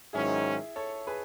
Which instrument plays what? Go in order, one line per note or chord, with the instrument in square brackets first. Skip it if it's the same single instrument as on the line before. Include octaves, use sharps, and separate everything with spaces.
[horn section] G#2 D#3 F#3 C#4 [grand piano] E4 G#4
[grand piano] A4 C#5
G#4 B4